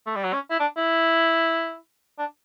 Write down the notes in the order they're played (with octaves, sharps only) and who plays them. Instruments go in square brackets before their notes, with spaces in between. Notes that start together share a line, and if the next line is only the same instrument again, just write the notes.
[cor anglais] A3
G3
F#3
C#4
E4
D4
E4
D4